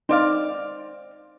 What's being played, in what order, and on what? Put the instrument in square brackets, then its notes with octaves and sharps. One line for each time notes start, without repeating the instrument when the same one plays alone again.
[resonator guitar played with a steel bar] C4 D5 F5 [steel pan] D#4